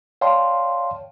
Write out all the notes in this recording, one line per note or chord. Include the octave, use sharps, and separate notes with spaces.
C#5 D5 F5 G5 A5 C6